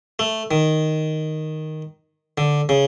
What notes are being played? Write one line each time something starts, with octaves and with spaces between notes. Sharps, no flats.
A3
D#3
D3
C#3